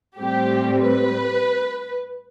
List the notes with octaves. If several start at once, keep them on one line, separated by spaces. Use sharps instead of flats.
A2 G3 C4 G4
B4